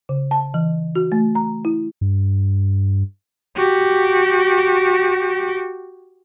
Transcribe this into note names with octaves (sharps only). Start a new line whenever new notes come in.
C#3
A5
E3
F#4
A3
A#5
E4
G2
F#4 G4